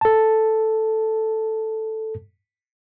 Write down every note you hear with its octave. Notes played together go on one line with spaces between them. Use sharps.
A4 A5